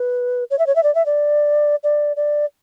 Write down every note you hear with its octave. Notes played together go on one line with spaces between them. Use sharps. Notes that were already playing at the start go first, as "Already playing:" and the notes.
Already playing: B4
C#5
E5
C#5
E5
D5
E5
D5
D5
D5